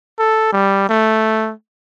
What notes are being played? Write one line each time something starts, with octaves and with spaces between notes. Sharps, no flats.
A4
G3
A3